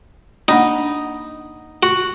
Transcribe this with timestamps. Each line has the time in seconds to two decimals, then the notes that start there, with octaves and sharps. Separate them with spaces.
0.48 A#3 D4 D#4 F#5
1.83 F#4